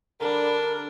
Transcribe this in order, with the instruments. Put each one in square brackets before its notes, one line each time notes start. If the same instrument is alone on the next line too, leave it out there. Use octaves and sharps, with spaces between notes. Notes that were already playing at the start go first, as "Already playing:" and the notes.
[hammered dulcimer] D3 G3 [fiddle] D4 [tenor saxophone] A#4